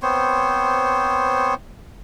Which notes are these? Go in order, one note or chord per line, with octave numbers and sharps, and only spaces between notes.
B3 C4 C5 C#5